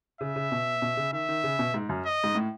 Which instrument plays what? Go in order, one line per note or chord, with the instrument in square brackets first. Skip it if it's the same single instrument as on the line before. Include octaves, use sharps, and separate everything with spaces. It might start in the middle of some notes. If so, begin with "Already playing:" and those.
[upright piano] C#3 [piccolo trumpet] E5
[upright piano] C#3
B2
B2
C#3
[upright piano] D#3 [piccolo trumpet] E5
[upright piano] D#3
C#3
B2
G#2
F#2
[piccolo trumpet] D#5
[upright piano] G#2
A2